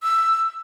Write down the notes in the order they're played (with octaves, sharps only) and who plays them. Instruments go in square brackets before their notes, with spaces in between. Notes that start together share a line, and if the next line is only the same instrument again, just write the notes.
[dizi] E6